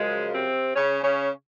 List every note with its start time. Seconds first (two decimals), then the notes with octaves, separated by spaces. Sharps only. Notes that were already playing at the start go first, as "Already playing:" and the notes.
Already playing: F#2 C#3 F3 G#3
0.33 C3 C4
0.75 C#3 C#4
1.03 C#3 C#4